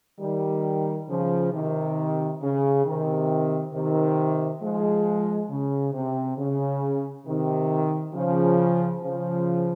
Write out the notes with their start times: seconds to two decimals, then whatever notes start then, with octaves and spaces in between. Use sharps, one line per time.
0.20 D#3 G3
1.09 C#3 F3
1.53 C3 D#3
2.41 C#3
2.85 C3 D#3
3.73 C3 D#3
4.61 F3 G#3
5.50 C#3
5.93 C3
6.38 C#3
7.25 C3 D#3
8.14 C#3 F3
9.02 C#3 F3